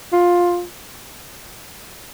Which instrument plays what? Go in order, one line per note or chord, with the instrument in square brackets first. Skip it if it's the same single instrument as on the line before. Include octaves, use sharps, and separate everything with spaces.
[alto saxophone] F4